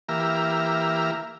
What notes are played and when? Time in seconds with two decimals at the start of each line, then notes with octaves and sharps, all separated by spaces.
0.09 E3 A#3 G4 E5 A#5 F6